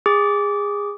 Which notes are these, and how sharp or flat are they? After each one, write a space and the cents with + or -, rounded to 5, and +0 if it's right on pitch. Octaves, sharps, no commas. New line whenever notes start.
G#4 -25 D6 -20